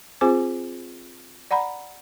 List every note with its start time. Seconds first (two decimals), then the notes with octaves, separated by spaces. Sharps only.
0.21 C4 F4 G#4 C5 G#5 D6
1.51 D5 F#5 A#5 B5